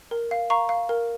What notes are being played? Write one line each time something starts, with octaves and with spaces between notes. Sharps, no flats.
A#4
F5
F5 A#5 C#6
F5
A#4